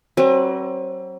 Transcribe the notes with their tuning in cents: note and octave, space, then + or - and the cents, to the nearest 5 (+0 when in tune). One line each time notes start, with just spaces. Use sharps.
F#3 +35 C4 +40 B4 +0